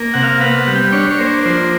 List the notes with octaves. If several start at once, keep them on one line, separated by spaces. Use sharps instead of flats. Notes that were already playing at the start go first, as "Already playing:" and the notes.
Already playing: A#3
C3 F#5
F5
B3 F#5
F#5
G3
G5
D4 C#5
C#5
A#3 C5
F3 C5